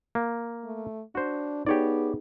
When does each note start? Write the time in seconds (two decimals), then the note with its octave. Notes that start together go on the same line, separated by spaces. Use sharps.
0.15 A#3
0.64 A3
1.15 D4 F#4 C5
1.67 B3 D#4 G4 G#4 C#5 D5